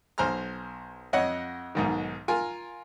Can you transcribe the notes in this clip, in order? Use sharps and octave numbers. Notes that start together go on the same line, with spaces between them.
B1 C5 G#5 A#5 F6
F2 C#5 D#5 F#5
B1 G#2 D#3
F4 A#4 G#5